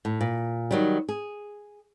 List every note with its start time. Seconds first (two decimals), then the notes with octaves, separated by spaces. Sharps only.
0.05 A2
0.21 A#2
0.71 D#3 F#3 G3
1.09 G#4